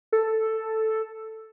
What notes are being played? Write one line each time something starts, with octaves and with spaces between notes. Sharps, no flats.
A4